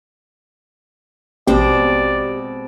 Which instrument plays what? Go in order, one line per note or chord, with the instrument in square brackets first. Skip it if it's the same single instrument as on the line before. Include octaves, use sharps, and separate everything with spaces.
[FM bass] A1 [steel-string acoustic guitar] B2 G#3 C4 [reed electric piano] G4 [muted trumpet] D5